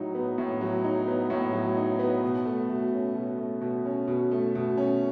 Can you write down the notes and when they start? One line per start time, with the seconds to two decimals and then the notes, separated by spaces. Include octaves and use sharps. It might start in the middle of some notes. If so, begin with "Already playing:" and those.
Already playing: A2 F#3 D#4
0.15 B3
0.38 A2
0.61 F#3
0.84 D#4
1.07 B3
1.30 A2
1.53 F#3
1.77 D#4
1.99 B3
2.23 B2
2.45 A3
2.69 B2
2.93 C#4
3.15 B2
3.38 A3
3.61 B2
3.85 C#4
4.08 B2
4.31 A3
4.55 B2
4.78 C#4